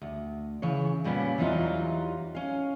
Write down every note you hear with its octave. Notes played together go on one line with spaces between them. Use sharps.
D2
C#3 E3 C#5
A#2 G3 A#3 B3 C#4
E2 E3 F#3 G3 D#4 F4
C#4 F5